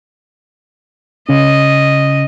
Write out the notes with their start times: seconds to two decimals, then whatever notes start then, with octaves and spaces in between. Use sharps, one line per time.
1.29 C#3 C#4 D#5